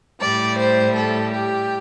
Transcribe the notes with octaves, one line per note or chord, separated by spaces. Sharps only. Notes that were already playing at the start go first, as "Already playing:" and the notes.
A2 G3 D5
C5
A4
G4